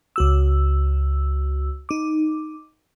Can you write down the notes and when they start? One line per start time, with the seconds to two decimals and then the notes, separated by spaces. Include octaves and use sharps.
0.16 C#2 F#4 E6
1.89 D#4 D6